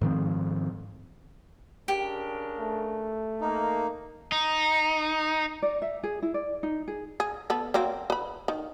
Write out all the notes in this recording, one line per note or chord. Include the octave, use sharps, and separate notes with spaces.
G#2 D#3 F3 C4
C#3 D4 G4 A#4
A3
A#3 D#4
D#4
D5
E5
G#4
E4
D5
D#4
G#4
G#4
B3 A4
F#3 A#3 C4
B4 B5
D#3